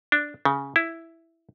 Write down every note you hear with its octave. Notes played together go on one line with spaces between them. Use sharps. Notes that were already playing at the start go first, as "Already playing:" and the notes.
D4
C#3
E4